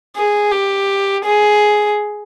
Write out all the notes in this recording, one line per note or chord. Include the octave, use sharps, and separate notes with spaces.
G#4
G4
G#4